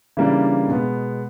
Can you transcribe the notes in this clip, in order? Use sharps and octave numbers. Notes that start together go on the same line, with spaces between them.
C#3 E3 G3 A#3 D4
B2 G#3 B3